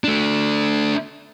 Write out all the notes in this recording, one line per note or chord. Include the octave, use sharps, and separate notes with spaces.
A3 D4